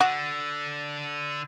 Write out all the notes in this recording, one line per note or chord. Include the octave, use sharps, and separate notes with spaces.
D3 F#4